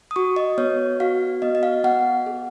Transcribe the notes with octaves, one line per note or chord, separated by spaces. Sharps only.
D#6
F#4 C#6
D#5
B3 C#5
F#4 F5
B3 D#5
D#5
F5
B3 F#5
G#4